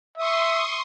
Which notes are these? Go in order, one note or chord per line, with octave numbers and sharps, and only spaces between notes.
E5 C6 C#6 D#6